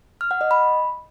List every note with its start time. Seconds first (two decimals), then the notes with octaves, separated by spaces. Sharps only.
0.21 F6
0.31 F#5
0.41 D#5
0.51 B5